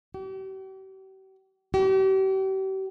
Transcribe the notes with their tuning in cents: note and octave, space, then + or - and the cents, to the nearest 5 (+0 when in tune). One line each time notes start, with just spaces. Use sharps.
G4 -45
G4 -40